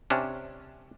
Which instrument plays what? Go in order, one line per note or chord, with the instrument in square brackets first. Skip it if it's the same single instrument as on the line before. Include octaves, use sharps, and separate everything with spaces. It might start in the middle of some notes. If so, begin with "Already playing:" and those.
[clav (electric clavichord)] C3 C#4 D4